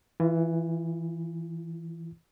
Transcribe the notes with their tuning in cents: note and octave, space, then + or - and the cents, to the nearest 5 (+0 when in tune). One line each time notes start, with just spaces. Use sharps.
E3 +0 F4 -35